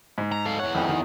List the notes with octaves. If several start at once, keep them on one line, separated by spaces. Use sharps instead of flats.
G#2
A#5
A4 F5
E2 C#5 F#5
G#1 F2 G5
D#3